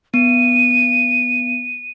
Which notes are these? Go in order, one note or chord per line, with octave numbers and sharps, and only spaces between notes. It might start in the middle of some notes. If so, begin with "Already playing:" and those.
B3 D#7